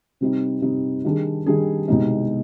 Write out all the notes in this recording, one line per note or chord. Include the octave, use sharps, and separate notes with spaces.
C3 G3 C4 D#4
C3 G3 C4 D#4
D#3 G3 D4 G#4
D#3 G3 D4 G#4
C2 B2 G#3 B3 D#4